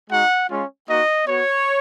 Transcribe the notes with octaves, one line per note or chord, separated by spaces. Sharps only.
G#3 D#4 F#4 F#5
G#3 C#4 F4
A#3 D#4 F#4 D#5
B3 F#4 C#5